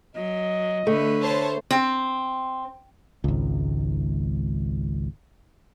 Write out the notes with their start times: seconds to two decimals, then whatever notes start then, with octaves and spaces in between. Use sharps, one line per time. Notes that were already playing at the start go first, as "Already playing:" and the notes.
0.15 F#3 D#5
0.87 D3 A3 B4
1.22 C5 C#5 A5
1.71 C4
3.24 G#1 C#2